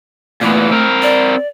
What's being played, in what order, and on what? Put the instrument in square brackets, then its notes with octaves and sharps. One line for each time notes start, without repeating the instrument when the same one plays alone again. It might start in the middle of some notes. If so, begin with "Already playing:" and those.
[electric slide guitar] A#2 E3 B3 [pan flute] A3
[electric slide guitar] C4 A#4
[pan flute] D5